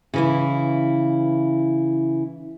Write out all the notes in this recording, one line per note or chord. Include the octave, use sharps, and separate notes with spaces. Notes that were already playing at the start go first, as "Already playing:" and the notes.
C#3 E3 E4